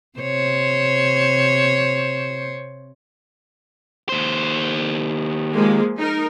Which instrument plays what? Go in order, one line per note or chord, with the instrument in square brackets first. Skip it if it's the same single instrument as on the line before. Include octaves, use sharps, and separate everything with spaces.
[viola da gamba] C3 C5 C#5
[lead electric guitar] D#2 C5
[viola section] F3 G#3 A#3
D#4 A#4